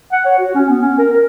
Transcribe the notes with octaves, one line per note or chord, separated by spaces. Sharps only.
F#5
C#5
F#4
C#4
B3
C#4
A#4
A#4